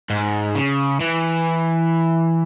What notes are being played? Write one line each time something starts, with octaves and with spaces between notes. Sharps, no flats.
G#2
C#3
E3